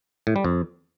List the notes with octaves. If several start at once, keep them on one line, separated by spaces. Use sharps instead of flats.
A2
G3
F2